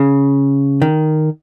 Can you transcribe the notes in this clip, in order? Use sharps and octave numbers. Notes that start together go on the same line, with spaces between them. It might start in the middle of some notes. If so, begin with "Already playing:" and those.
Already playing: C#3
D#3